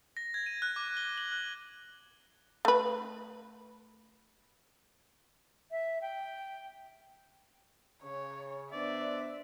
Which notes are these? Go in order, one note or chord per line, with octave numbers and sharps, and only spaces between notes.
A#6
G#6
D#7
F#6
D6
G7
F#7
F#6
A3 B4
E5
G5
C#3 C#5
B3 D4 C5 D5 E5